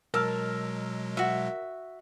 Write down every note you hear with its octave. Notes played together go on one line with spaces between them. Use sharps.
B2 F#3 G#3 A#4 A5 E6 F6
F#4 E5